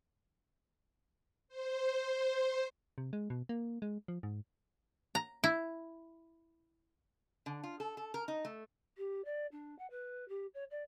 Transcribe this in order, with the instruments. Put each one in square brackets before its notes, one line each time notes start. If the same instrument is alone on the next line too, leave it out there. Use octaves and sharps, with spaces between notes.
[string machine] C5
[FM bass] C3
G#3
B2
A#3
G#3
F3
G#2
[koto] A#5
E4
[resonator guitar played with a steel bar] D3
F4
A4
A4
A#4
D#4
A3
[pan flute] G4
D5
D4
F#5
B4
G4
C#5
D5